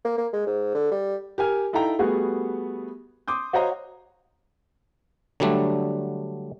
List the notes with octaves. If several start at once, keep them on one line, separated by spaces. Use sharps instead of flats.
A#3
A#3
G#3
G#2
D3
G3
G4 A#4 G#5 F6
D#4 E4 A4 F5 G5 A#5
G3 A3 B3 F#4 G#4
C6 D6 D#6 G6
F#4 C5 C#5 D#5 F5 A#5
D3 F#3 G3 A3 D4